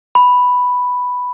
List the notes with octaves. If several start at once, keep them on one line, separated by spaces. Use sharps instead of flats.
B5